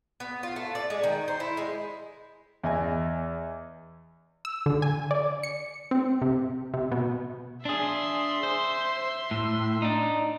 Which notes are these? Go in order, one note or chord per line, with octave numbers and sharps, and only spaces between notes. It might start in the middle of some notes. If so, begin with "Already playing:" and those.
B3
F4
A3
D5
G#3
D#3
C5
E4
G#3
E2 D#5 G#5
E6
D3
G#5
D5
C#7
C4
C3
C3
B2
D4 G#4 E5 C6
C5
A2
D4 D#4